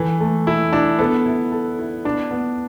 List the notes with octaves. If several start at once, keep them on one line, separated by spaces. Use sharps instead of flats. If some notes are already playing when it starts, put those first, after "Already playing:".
Already playing: E3 A4
A3
A3 E4
D4 E4
B3 A4
E4
A4
E4
B3 D4
B3